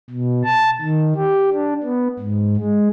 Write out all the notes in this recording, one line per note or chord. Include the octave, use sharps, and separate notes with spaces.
B2
A5
D#3
G4
D4
B3
G#2
G#3